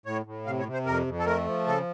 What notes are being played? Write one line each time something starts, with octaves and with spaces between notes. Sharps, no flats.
A2 C#5
A2
C3 F5
C#5
C3
C5
F2 A#4
F2
A4
A3 A#4
F3
C#3 A4